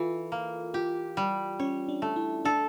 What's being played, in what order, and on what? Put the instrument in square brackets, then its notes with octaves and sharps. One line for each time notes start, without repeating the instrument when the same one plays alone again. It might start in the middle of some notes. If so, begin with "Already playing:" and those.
Already playing: [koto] E3 [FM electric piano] F4 A4
[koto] A#3
[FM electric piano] F4 [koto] G4
[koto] G3
[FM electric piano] C#4 [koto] C#5
[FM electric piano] D4
[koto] A3
[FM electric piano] E4
[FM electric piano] D4 [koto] A4